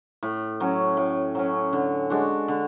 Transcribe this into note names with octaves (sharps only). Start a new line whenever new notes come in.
A2
F#3 C#4
A2
F#3 C#4
D3
G#3 D4 F#4
D3